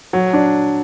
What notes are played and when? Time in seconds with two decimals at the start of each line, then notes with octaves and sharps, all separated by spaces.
0.13 F#3
0.33 D4